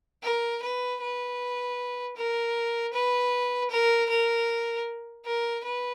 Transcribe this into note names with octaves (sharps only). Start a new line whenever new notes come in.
A#4
B4
B4
A#4
B4
A#4
A#4
A#4
B4